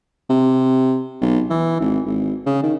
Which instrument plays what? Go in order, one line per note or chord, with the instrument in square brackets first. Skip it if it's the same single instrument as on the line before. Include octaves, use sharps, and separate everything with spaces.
[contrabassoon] C3
B1
E3
G#1
G#1
C#3
D#3